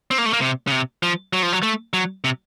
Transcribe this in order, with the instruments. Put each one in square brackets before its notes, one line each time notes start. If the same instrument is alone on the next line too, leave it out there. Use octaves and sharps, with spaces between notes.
[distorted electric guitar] C4
A#3
A3
A#3
C3
C#3
C3
F3
F#3
F3
F#3
A3
F#3
C3